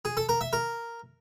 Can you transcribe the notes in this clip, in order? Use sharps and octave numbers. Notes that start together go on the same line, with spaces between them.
G#4
A4
A#4
E5
A#4